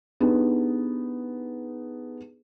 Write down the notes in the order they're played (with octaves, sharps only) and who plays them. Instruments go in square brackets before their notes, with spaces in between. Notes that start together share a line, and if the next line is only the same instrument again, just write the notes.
[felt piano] B3 D4 D#4 G4 G#4